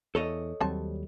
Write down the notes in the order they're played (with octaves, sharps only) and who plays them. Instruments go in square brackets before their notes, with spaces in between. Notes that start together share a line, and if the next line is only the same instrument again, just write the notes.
[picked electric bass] E2 [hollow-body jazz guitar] A4 C#5 D#5
[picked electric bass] D#2 F#3 G3 [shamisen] C4 A5